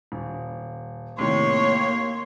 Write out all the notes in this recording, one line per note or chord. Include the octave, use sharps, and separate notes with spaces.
D#1
A2 C3 D#3 A#3 C#5 C6